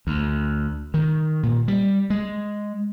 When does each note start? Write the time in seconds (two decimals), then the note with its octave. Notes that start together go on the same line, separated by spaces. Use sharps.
0.07 D2
0.94 D#3
1.43 A#2
1.68 G3
2.10 G#3